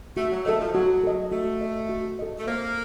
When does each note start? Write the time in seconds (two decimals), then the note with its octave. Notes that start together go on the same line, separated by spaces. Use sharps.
0.16 A3 F#4
0.32 F#3
0.46 A3 A4 D#5
0.60 F3
0.75 F#3 F#4
1.03 A4 D#5
1.31 A3 F#4
1.61 A4 D#5
1.89 F#4
2.19 A4 D#5
2.39 A3
2.47 A#3 C5